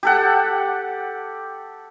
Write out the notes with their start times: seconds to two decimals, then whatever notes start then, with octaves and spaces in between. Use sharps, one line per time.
0.03 G4 A4 F#5